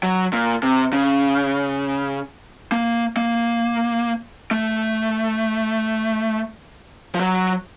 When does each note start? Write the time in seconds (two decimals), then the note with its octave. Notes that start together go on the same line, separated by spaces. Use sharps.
0.03 F#3
0.33 A#2
0.63 C3
0.93 C#3
2.72 A#3
3.17 A#3
4.51 A3
7.15 F3
7.20 F#3